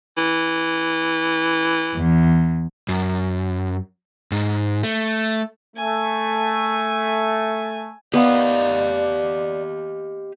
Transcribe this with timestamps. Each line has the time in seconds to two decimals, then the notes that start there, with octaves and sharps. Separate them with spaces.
0.18 E3
1.95 E2
2.88 F#2
4.32 G#2
4.83 A3
5.76 A3 G#5
8.14 B3 G4 D5 D#5 F5